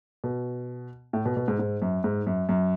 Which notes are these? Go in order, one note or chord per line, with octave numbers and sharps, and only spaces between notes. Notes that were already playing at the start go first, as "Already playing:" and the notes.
B2
A2
B2
B2
G#2
G#2
F#2
G#2
F#2
F#2